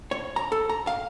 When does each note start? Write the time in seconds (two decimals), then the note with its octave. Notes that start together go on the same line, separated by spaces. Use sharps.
0.11 C#5
0.36 A#5
0.52 A4
0.69 A#5
0.87 F5